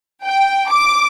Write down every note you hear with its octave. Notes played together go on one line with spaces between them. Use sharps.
G5
D6